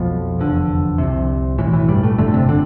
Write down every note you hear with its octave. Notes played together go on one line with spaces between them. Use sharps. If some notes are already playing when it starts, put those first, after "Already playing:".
Already playing: B1 F2 B2 F3
F1 E2 D3
C2 C3
B1 A2 E3
E3
G2 G3
A2 A3
G1 F2 A2 D3 A3
C3 C4
D3 D4